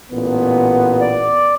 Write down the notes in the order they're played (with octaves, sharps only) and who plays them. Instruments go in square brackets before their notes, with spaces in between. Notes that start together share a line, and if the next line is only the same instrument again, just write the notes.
[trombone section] A1 A#2 B3
[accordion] D5